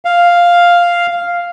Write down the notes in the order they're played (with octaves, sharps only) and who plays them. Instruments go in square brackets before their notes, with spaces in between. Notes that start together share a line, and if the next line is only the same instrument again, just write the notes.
[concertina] F5